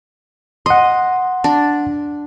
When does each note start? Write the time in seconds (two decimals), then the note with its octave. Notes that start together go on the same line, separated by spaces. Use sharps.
0.66 D#5 F#5 C6
1.44 D4